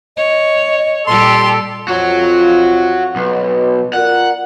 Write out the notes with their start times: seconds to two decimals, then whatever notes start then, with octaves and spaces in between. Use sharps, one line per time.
0.17 C#5 D#5
1.07 A#2 G3 G4 A4 C6
1.88 F2 F4 F#4 C#5
3.16 B1 B2 B3
3.93 F4 A#4 D5 F#5